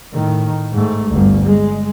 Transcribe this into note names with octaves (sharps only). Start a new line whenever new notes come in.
A2 D#3
G#2 A3
G1 D2
G#3